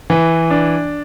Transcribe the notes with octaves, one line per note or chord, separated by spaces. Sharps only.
E3
D4